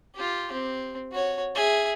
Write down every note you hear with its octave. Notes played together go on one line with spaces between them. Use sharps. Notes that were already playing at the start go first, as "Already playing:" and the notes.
F4 G4
C4
F#4 C#5
G#4 E5